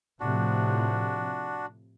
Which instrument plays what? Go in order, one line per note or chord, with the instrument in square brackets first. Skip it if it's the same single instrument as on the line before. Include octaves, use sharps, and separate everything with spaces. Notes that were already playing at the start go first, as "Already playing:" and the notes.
[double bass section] A2 C3 F3 [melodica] D4 F#4